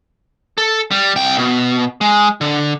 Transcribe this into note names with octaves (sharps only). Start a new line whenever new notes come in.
A4
G3
C2 G5
B2
G#3
D3